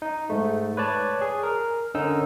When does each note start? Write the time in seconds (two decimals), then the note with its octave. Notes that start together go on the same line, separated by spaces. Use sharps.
0.02 D#4
0.30 G#2 A3
0.77 B4 C#5 D5 A5
1.21 G#4
1.43 A#4
1.95 D3 C#4 D#4 A#4 E6